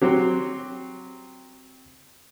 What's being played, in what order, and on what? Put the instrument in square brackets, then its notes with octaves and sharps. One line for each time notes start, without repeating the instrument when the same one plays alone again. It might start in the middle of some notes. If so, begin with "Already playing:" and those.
[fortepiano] F#3 C4 G4